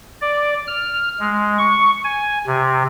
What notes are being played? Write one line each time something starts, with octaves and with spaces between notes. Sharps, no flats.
D5
F6
G#3
C#6
G#5
C3